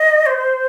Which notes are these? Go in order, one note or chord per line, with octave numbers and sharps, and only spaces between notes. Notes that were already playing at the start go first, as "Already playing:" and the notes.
Already playing: D#5
C5